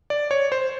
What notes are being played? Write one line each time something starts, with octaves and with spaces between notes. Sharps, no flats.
D5
C#5
C5